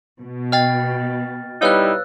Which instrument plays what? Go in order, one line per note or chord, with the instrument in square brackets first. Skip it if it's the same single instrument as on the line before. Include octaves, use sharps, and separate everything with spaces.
[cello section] B2
[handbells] D#5 G5 [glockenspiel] F6 A6
[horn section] G3 D#4 E4 [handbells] B4 C#5 F5 [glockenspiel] E6 F#6